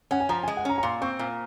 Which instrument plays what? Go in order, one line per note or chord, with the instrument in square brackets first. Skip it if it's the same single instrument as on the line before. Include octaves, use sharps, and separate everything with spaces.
[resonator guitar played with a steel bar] C#4 [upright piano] F#5
[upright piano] G#5
[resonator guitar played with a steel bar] F3 [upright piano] A#5
[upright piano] G#5
[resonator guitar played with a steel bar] G#3
[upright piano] F#5
[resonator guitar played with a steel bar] C#4 [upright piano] A#5
[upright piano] A#5
[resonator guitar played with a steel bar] A#2 [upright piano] C6
[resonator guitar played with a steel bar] C4 [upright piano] C#6
[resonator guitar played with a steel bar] A#2